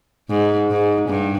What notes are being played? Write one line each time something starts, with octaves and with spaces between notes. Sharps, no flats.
G#2
G#2
G2